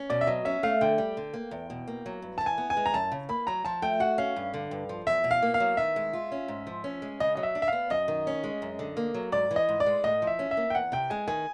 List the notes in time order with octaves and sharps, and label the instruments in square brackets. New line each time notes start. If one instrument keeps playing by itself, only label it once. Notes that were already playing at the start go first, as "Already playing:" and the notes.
Already playing: [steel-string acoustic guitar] C#4
[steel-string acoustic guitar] B2 [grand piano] D5
[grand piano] E5
[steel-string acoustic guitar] F#3 [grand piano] D#5
[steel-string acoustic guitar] C#4 [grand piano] E5
[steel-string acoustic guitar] A3 [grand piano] F5
[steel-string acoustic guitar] D3 [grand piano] G5
[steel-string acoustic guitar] G3
D3
A#3
E2
B2
A#3
F#3
G2
[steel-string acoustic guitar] E3 [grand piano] A5
[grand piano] G#5
[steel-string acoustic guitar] B3
[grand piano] G#5
[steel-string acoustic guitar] G#3
[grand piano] A#5
[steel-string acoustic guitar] F#2 [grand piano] A5
[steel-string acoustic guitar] C#3
[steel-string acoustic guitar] A#3 [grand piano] B5
[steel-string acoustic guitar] F#3 [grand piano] A#5
[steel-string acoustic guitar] F3 [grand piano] A5
[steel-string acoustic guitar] A3 [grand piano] G5
[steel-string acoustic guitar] F#4 [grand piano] F#5
[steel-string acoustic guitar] C#4 [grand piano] F5
[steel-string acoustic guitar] G2
D3
G2
F3
[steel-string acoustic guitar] E2 [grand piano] E5
[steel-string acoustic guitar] B2
[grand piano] F5
[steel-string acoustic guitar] A#3
[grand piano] F5
[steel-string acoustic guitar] F#3
[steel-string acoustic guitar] D#3 [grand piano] E5
[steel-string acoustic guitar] G#3
F4
C#4
G#2
F3
C#4
G#3
[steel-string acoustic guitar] C#3 [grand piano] D#5
[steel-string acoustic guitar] F#3 [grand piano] D#5
[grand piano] E5
[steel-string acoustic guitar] D4
[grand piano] E5
[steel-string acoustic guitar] B3 [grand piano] F5
[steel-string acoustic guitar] F#2 [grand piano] D#5
[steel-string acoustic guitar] D#3
C#4
G#3
F#2
D3
A#3
F#3
[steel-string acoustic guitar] G#2 [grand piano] D5
[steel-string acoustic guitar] E3
[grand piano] D#5
[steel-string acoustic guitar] G#2
[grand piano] D5
[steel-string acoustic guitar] G#3
[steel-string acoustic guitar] A2 [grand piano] D#5
[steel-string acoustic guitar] F3
[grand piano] E5
[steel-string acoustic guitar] C#4
[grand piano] E5
[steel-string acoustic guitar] A#3
[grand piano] G5
[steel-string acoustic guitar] E2 [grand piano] F#5
[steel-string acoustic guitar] C3 [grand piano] G5
[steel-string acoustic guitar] G#3 [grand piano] G#5
[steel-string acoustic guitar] D#3 [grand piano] G#5